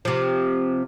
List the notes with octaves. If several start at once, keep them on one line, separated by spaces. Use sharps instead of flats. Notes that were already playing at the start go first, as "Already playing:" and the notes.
C3 F3